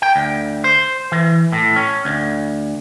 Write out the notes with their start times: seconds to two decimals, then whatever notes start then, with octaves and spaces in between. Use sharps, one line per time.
0.02 G5
0.16 D2
0.64 C5
1.12 E3
1.52 A2
1.76 C#4
2.05 D2